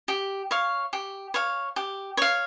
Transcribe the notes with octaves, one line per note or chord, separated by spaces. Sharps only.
G4
C#5 F5
G4
C#5 F5
G4
C#5 F5